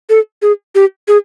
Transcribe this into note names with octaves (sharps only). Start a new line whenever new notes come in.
A4
G#4
G4
G#4